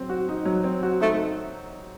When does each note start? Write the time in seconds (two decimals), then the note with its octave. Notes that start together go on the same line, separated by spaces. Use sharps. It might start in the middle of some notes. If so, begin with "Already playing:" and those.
Already playing: F#3 C4
0.09 F#4
0.29 D#4
0.45 F#3
0.64 C4
0.83 F#4
1.00 A3 D#4